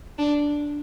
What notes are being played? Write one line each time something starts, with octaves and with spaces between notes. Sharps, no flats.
D4